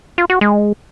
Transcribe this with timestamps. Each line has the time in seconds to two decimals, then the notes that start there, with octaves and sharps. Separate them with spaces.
0.18 F4
0.30 F#4
0.41 G#3